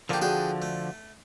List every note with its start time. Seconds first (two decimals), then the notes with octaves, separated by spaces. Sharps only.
0.09 D3 F3 A#3 D4 G4
0.22 F#4 G#4 D5 G5
0.62 A3